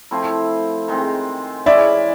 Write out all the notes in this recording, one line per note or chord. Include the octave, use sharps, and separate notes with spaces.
F3 A3 C4 E4
D#3 G#3 C4
E3 G#3 C#4 E4 D5 E5